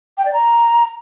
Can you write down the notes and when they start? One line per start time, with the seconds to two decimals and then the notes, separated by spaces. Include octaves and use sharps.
0.18 G5
0.25 D5
0.33 A#5